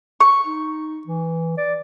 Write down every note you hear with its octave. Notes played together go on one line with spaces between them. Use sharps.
C#6
D#4
E3
D5